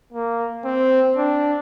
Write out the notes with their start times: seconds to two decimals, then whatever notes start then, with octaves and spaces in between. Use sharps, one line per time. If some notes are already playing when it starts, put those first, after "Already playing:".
0.13 A#3
0.65 C4
1.17 D4